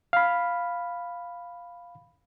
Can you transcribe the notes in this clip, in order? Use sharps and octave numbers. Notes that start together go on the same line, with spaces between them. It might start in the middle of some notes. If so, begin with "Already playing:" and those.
F5 B5